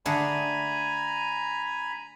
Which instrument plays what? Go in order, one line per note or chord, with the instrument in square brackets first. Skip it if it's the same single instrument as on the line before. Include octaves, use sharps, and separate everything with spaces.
[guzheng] D3 A3 G#4 [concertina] G#5 A#5 B5